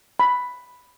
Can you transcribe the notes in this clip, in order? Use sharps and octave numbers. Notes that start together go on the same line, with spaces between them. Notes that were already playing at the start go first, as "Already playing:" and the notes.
B5